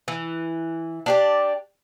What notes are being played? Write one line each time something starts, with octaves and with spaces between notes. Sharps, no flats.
E3
D4 G4 D5